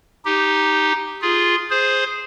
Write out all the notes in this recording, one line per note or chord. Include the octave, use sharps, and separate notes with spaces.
D#4 G4
F4 G#4
G#4 C5